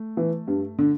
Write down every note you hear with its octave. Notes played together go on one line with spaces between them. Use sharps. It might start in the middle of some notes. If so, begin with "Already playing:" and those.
Already playing: A3
E3
G2
D3